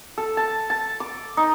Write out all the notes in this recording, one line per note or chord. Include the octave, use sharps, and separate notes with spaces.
A4
A5
A5
D6
D#4